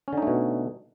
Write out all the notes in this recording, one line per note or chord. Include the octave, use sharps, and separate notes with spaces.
B2 D3 A3 C#4 D#4